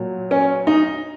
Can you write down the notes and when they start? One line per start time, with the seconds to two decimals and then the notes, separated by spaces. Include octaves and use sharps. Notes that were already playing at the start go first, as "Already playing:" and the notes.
Already playing: A#2 F#3
0.31 C#4
0.67 D#4